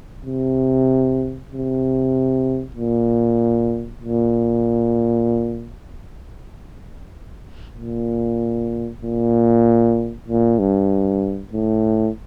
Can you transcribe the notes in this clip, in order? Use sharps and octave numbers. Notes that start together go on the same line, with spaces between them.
C3
C3
A#2
A#2
A#2
A#2
A#2
G2
A2